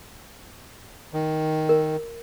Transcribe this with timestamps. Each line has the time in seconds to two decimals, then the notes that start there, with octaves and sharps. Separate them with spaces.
1.13 D#3
1.69 A#4